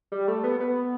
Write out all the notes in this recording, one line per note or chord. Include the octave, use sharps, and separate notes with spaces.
G3
A3
B3
B3